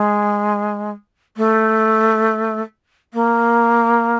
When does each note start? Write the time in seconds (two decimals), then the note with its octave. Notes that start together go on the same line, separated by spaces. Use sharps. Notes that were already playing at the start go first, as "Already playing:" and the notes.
Already playing: G#3
1.37 A3
3.13 A#3